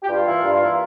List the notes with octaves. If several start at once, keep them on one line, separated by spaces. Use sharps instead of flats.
G4
G2 F4
E3 A#3 E4
G2
E3 A#3 E4